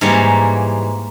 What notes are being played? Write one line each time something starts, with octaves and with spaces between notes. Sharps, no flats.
G#2 E3 G3 A#3 C#5